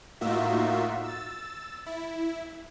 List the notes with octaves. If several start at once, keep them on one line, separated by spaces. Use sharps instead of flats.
A2 A#3 D#4 F4 F#4 E5
E6 A6
E4